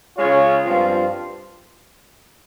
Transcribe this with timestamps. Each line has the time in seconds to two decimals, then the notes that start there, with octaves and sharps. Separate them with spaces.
0.17 C#3 G#3 C#4 F4 C#5
0.65 G2 F3 C4 F4